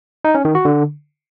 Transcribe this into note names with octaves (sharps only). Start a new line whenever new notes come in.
D#4
C#4
D#3
F#4
D3